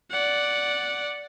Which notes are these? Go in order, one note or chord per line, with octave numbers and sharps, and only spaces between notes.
D5 F#5